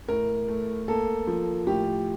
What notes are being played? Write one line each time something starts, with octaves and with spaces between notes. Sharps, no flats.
A2 A#4
A3
A#3 A4
F3
A2 G4